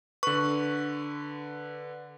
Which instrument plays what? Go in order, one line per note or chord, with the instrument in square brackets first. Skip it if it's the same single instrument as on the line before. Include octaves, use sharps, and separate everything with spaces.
[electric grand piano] D3 B4 [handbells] C#6